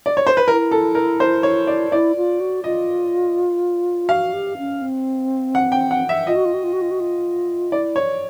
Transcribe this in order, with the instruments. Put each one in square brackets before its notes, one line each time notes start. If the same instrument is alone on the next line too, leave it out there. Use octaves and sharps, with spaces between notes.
[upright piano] D5
C#5
C5
B4
[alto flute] E4 [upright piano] A#4
[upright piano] A4
A#4
C5
C#5
D5
[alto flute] E4 [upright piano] D5
[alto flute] F4
F#4
[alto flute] F4 [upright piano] D#5
[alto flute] F#4 [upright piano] F5
[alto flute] G4
C#4
C4
[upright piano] F#5
G5
F#5
E5
[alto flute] F4 [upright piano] D#5
[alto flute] F#4
F4
F#4
F4
F#4
F4
F#4
F4
[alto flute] E4 [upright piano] D5
[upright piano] C#5